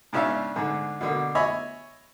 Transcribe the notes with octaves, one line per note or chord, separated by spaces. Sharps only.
G#2 C#3 C#4 D4 E5 F5
G#2 D3 G#4
B2 D3 A#3
C#5 D#5 E5 G#5 B5